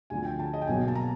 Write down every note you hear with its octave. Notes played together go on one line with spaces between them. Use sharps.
D2 D3 F3 G#5
G5
A5
D#5
G5
B1 B2 F#3 A#3 G#5
A5
A#5